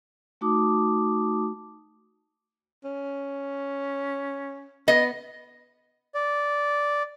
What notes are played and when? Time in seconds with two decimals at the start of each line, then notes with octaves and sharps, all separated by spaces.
0.41 A3 D#4 F#4 A5 D6 D#6
2.84 C#4
4.88 B3 D#5
6.15 D5